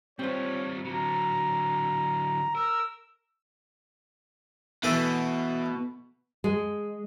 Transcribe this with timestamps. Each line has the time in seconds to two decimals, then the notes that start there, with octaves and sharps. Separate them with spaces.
0.19 G3 C4 F4 C5 C#5
0.85 D3 F#3 A#5
2.55 A#4 E6
4.83 B2 E3 A3 A4
6.44 G#3